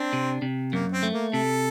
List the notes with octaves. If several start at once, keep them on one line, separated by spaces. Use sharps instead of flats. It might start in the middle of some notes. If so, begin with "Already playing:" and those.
Already playing: C4 D4
C3
C3
F#2 A#3
C4
A3
A#3
C3 A4